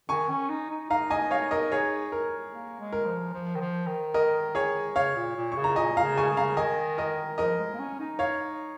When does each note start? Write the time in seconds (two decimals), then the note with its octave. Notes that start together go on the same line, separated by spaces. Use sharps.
0.09 D#3 G#5 C#6
0.29 C#4
0.49 D#4
0.70 D#4
0.90 D#4 F5 A#5
1.10 D#5 G#5
1.31 C#5 F5
1.51 A#4 D#5
1.72 G#4 C#5
2.12 A#4
2.52 A#3
2.80 G#3
2.93 A#4
3.06 F3
3.33 F3
3.56 D#3
3.60 F3
3.87 D#3
4.14 A#4 D#5
4.55 G#4 C#5
4.95 C#3 C#5 F5
5.16 A#2
5.36 A#2
5.52 C#3 C#6
5.64 A#5
5.76 A#2 D#5 G#5
5.97 F5 A#5
6.03 C#3
6.18 G#5 C#6
6.31 C#3
6.37 F5 A#5
6.57 D#3 D#5 G#5
6.98 A#4 D#5
7.38 F3 A#4 D#5
7.59 G#3
7.74 A#3
7.79 C#4
7.99 D#4
8.19 C#5 F5